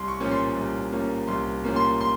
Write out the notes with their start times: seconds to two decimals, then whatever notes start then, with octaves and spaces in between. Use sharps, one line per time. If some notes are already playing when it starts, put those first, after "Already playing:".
Already playing: C2 C6
0.08 C#6
0.20 A#2 F3 A#3 C#4
0.31 C6
0.56 C2
0.92 A#2 F3 A#3 C#4
1.28 C2 C6
1.64 A#2 F3 A#3 C#4
1.76 C6
2.01 C6